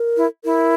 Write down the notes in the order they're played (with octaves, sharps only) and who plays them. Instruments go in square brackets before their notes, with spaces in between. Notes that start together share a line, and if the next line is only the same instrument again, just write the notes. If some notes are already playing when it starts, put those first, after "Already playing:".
Already playing: [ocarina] A#4
[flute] E4
[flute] E4 [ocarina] A#4